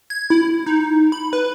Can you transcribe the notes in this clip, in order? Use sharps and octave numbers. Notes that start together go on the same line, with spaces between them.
G#6
E4
D#4
B5
B4